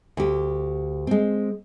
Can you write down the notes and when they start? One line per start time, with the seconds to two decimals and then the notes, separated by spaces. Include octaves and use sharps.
0.17 D2 G4
1.07 G#3 C4